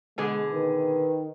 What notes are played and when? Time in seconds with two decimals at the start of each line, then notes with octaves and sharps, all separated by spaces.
0.18 B2 D3 G#3 G#4
0.52 D#3 B4